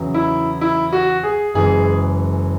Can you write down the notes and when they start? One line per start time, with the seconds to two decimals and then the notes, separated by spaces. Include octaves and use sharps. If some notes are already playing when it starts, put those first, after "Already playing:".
Already playing: E2 C#3 F#3
0.14 E4
0.61 E4
0.92 F#4
1.23 G#4
1.54 F#1 F#2 E3 G#3 G#4